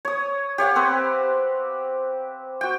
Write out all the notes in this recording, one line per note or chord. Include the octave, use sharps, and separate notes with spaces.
C#5 D#6
G4 C#5 F5 F#5
C4 B4 C5
F#4 G5